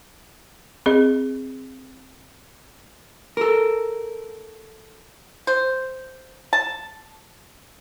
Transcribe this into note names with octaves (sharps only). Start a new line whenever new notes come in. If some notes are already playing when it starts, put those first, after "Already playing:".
C4 G#4 D#5
A4 A#4
C5
A5